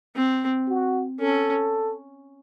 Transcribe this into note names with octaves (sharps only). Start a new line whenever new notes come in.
C4
F#4
C#4 A4